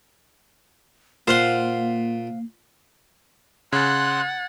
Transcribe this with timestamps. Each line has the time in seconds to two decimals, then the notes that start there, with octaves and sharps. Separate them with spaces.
1.28 A#2 A#3 C5 F5 F#5 C6
3.73 C#3 F#5 C6 F#6 G#6 A6